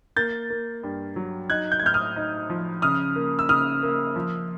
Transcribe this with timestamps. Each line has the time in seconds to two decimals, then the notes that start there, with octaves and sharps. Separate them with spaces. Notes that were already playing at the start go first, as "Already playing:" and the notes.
0.16 A#3 G6 A6
0.50 A#3
0.83 G2
1.16 F#3
1.50 D#4 F#6 G#6
1.72 G6
1.80 G#6
1.83 A2 F6 G6
1.94 D#6 F6
2.16 D#4
2.50 F3
2.82 C#3 D#6 F6
3.16 A#3
3.39 E6
3.49 C#3 D#6 F6
3.83 A#3
4.16 F3